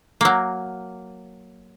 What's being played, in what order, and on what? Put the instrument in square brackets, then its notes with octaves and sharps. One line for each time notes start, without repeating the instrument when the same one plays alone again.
[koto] F#3 A#3